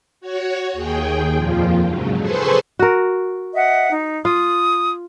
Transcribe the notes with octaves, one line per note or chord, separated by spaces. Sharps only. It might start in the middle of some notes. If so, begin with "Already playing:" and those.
F#4 C#5
D#2 G#4 G5
F2 A#2 F3 F4
G#2 C#3 F#3
G#4 A4 B4 C5 C6 C#6
F#4 A#4
D#5 E5 F#5
D#4
F4 D#6